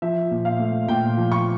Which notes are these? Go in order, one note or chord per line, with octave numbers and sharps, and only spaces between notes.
F3 E5
A#2
F5
A3
A#2 G5
F3
C#6